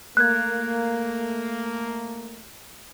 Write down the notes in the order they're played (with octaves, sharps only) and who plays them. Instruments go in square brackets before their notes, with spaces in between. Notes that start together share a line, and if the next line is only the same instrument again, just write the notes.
[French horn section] A3 A#3 [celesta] F#6 G#6